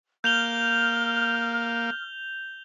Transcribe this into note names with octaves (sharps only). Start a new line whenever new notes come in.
A#3 F6 G6 F7 G7